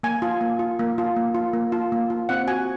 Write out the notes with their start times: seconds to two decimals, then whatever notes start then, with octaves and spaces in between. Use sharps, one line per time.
0.03 A#3 G#5
0.22 F4
0.41 A#3
0.59 F4
0.79 A#3
0.98 F4
1.16 A#3
1.35 F4
1.53 A#3
1.72 F4
1.92 A#3
2.10 F4
2.29 C4 F#5
2.48 F#4 G#5